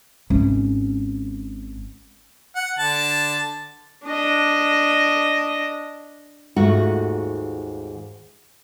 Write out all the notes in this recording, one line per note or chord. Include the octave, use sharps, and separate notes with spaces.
G#1 C#4
F#5
D3 A5
D4 D#5
D#2 G#2 A3 F4 F#4 F#5